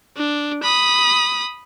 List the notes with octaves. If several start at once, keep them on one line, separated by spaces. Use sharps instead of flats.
D4
B5 D#6